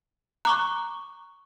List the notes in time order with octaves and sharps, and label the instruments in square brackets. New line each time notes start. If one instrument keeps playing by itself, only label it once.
[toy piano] A#5 [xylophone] C#6 D6 F#6